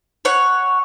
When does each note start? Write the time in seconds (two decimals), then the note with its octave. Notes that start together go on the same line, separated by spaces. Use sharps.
0.25 C#5 F#5